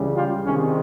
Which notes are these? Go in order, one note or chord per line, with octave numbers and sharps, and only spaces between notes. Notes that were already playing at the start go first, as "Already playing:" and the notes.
Already playing: C#2 C#3 E3 G3
F4 G4
C2 C3 D#3 G#3 C#4